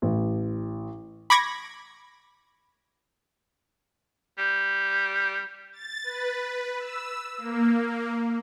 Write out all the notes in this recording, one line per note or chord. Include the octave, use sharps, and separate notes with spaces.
A1
B5 C#6 D6 G#6 A#6
G3
A6
B4
E6
A#3